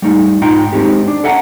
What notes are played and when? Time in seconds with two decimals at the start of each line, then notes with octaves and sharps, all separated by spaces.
0.02 G3 A3 D#4
0.42 G#2 D#4 F4 G5 A#5
0.73 G#3 C4 D#4 G4
1.08 D4
1.24 A4 E5 F#5 G#5 A#5